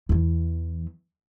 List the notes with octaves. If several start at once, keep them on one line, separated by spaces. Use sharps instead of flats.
E2 E3